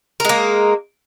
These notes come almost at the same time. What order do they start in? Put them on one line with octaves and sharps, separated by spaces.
A#4 G#3 A#3